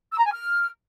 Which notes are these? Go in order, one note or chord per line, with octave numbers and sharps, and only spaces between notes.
E6
A#5
G#5
F6